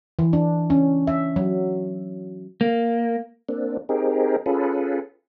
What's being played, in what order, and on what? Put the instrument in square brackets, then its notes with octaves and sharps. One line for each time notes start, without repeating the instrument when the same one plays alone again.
[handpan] E3
D4
C#4
E5
F#3
[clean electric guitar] A#3
[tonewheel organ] A#3 C4 D4
C4 D#4 G4 G#4 A#4
C#4 F4 G#4 A4 B4